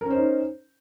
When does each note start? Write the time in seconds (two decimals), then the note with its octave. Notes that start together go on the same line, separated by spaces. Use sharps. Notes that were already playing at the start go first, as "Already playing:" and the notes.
0.01 A#4
0.06 C#4
0.10 C5
0.15 D#4